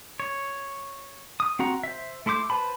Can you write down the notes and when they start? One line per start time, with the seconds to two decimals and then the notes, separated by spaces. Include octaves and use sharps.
0.20 C#5
1.40 D#6
1.59 C4 F#4 F#5 A#5
1.83 C5 E5
2.26 A3 E4 C6 D6 G6
2.50 B4 C5 A5 B5